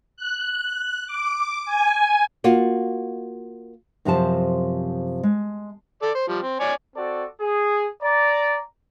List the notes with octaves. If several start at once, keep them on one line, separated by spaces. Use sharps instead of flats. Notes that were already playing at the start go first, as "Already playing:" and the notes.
F#6
D6
G#5
A#3 F4 F#4
F#2 C3 F3 G4 C5 A5
G#3
A4 D5
C5
F3 G3
C4
C#5 D5 G#5
C4 F#4 A4 D5
G#4
D5 A#5